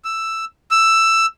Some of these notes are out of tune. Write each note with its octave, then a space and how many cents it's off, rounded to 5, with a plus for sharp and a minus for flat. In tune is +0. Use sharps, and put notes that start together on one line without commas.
E6 +5
E6 +10